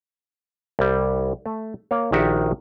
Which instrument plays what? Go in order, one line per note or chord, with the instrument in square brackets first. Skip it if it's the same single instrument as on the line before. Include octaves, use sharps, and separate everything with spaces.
[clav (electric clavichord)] C2 G3
A3
A#3 C#5 F5
A#1 D#3 F#4 G4 E5